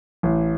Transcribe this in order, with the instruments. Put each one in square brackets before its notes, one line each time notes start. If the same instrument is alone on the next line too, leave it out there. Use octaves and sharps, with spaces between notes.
[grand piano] A1